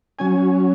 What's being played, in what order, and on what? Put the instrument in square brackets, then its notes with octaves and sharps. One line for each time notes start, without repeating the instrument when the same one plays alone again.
[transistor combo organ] F#3 C#4 G#5